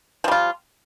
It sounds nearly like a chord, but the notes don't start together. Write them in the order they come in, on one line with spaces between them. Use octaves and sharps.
F3 G3 F4